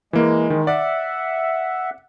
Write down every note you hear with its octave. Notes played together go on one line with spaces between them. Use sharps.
E3 G#3 A#3
D#3
D5 E5 F#5